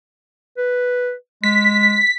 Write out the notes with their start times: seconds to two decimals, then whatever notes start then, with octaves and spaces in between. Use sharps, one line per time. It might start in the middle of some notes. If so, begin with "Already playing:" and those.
0.57 B4
1.44 G#3 B6